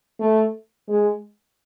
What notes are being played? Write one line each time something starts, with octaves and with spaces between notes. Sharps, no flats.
A3
G#3